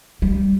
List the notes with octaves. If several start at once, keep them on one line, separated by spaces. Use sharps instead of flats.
G3